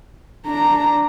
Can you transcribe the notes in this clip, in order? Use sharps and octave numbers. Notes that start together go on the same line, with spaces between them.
D4 A#5